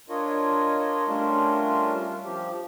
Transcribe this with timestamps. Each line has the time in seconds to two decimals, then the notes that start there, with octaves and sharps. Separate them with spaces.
0.09 D4 F4 A#4 C#5 D#5
1.08 G3 A3 C#4 D4 F4 A#4
2.25 F3 G4